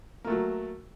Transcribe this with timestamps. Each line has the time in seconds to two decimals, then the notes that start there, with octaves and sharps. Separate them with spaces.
0.24 A#3
0.27 A3
0.30 F#3